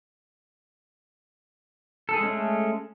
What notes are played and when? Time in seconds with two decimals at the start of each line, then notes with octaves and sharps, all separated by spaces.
2.09 A4
2.13 G#4
2.18 G#3
2.23 C#4
2.28 A3